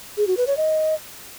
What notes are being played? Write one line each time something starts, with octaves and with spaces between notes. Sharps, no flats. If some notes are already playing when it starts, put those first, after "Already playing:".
G#4
F#4
B4
C#5
D#5